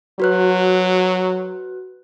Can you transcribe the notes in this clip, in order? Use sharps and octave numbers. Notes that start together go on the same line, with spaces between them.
F#3 F#4 B4 F#6